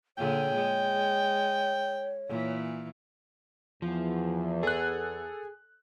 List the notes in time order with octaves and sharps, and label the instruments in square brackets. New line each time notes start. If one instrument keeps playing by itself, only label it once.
[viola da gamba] A#2 D3 G#4 [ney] C#5 [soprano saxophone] G5
[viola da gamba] G#3
A#2 E3
[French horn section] E2 [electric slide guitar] F3
[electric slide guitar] G#4 [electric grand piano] A4 F#6